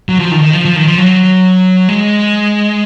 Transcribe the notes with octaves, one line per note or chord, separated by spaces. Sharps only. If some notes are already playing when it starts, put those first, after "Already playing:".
F#3
F3
D#3
D#3
F3
F3
D#3
F3
F#3
G#3